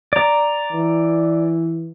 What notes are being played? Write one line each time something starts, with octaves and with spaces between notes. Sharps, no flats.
D5 A#5
E3